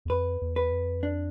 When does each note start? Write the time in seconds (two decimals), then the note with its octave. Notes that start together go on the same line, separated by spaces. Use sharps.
0.05 E2
0.09 F2 B4
0.41 E2
0.56 B4
0.72 F2
1.03 D4